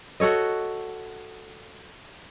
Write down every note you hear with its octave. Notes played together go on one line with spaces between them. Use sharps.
F#4 A4 C#5 D#5